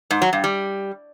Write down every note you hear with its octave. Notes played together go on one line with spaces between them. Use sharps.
G#2
F#3
G2
G3